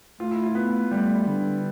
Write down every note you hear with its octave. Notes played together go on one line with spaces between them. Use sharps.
A3 F4
E4
F4
B3
G3 A3
D3